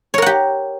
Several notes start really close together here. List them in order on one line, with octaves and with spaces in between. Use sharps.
C#5 A#4 F#5 G4